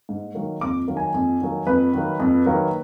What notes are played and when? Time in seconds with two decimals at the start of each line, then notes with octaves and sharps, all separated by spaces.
0.09 G#2
0.35 D#3 F#3 A#3
0.61 F2 D6
0.88 D#3 F#3 A#3
0.97 G#5
1.14 F2
1.41 D#3 F#3 A#3
1.67 F2 B4
1.93 D#3 F#3 A#3
2.19 F2
2.46 D#3 F#3 A#3